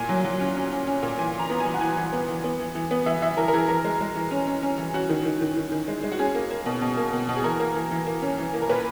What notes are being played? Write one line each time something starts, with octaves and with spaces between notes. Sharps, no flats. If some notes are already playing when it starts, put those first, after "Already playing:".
Already playing: A#2 G#5
F#3
F#3
C#4
C#4
C#4
C#4
A#2
E3 G#5
E3
A#5
B3
G#5
E3
F#5
E3 G#5
E3
B3
E3
B3
E3
E3
B3
E3 E5
E3 E5
E3 A#4
A#4
E3 G#4
E3 A#4
G#3
G#3
E3
C#4
C#4
C#4
E3
C#4 F#4
D#3
D#3
D#3
D#3
D#3
G#3
G#3
F#4
C#4 G#4
A#3
A#3
B2
B2
A#3
B2
B2
G#4
E3 A#4
A#3
E3
E3
A#3
C#4
E3
A#3
A#4
A#2 B4